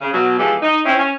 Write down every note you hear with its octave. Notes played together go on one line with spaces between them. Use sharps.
C#3
B2 F#3
E3 F3 G#3 B3 G4 A4
D#4
C4 C#4 E4
C#4